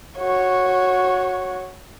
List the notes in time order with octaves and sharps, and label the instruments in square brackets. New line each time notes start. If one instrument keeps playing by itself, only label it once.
[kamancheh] F#4 C#5